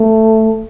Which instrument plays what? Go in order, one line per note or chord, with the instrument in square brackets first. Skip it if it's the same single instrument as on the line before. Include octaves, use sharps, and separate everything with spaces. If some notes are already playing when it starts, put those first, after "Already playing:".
Already playing: [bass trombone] A3